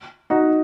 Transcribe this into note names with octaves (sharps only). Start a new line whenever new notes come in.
D#4 F#4